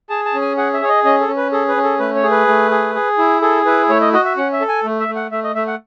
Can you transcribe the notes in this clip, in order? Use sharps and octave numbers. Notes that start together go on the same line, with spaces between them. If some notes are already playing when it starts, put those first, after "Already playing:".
G#4 A5
A5
C#4
G#5
G#4 F#5
E5
G#4 C#5
D#5
C#4 D#5
A4
C#4
B4
G#4 A4
B4
C#4
A4
A3 B4
C#5
G#4
B4
A3
G#4
G#4
E4
G#4 A4
E4 B4
A3 C#5
D#5
F#4 D#5
E5
C#4 F#5
E5
A4
G#5
A3
E5
A3
F#5
A3 E5
D#5
A3 E5
F#5